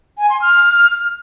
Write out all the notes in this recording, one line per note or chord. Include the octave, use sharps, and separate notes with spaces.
G#5
C6
F6